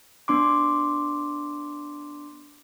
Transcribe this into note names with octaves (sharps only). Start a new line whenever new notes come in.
B3 D4 C6 D6